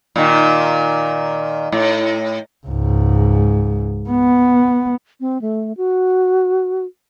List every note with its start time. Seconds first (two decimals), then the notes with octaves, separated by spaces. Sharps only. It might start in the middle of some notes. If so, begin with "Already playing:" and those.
0.16 A#2 D#3
1.72 A2
2.67 C#2 G#2
4.10 B3
5.20 C4
5.41 A3
5.77 F#4